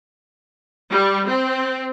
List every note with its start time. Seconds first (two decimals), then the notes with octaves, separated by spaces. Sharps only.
0.92 G3
1.28 C4